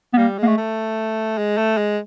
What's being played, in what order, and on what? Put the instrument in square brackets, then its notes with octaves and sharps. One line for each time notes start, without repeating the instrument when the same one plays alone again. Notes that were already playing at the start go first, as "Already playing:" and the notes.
[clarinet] B3
[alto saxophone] G3 [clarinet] A#3
[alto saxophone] G#3 [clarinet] A#3
[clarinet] A3
[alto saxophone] A3
G#3
A3
G#3